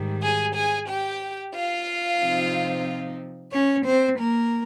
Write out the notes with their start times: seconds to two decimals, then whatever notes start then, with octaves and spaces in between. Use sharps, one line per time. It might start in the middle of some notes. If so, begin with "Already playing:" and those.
Already playing: G#2 D#3 G3
0.22 G#4 G#5
0.55 G#4 G#5
0.88 G4 G5
1.54 F4 F5
2.21 C3 F3 C4 D#4
3.52 C#4 C#5
3.85 C4 C5
4.18 A#3 A#4